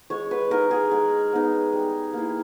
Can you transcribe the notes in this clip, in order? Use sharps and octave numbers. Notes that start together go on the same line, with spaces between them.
G#3 C#5
B4
D#4 A#4
G#4
G#3 G#4
B3 D#4
G3
A#3 E4